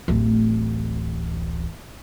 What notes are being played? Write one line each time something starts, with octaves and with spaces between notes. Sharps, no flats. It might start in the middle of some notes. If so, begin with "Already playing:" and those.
D1 A1